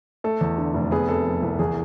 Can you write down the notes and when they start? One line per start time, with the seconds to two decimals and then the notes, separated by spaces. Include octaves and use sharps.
0.24 A3 A4
0.41 E2
0.58 D3
0.74 F1
0.91 B3 G#4
1.08 C3 A4
1.26 F3
1.43 C2
1.59 E2 G#4